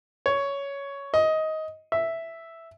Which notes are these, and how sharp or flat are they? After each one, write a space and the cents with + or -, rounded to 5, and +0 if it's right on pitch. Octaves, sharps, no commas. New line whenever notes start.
C#5 +10
D#5 +15
E5 +0